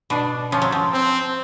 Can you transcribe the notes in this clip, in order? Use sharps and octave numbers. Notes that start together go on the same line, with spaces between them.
B2 D4
F3 C#4
F#3
F3
C4